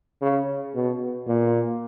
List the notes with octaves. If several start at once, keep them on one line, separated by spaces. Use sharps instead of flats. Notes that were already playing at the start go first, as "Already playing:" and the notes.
C#3
B2
A#2